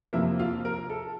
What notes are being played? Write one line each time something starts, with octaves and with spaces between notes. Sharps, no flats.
F2 C3 F3 A#3 E4 E5
F4 F5
A#4
A4